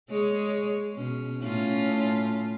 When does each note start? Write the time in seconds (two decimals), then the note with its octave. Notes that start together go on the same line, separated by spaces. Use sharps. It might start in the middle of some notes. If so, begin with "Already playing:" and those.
0.10 G#3 G#4 C#5
0.95 B2 C#4
1.43 A2 C#4 F4